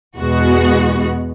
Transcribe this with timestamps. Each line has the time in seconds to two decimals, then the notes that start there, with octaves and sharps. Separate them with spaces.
0.18 E2 B2 G#3 B3 F#4